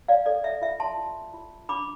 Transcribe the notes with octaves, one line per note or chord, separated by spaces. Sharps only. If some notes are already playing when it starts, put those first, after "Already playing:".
D5 F5
A4 D5
E5
F4 E5
A5 C6
F4
F4
D4 B5 D6